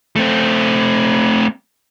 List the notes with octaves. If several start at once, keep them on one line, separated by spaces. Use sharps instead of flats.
A3 C4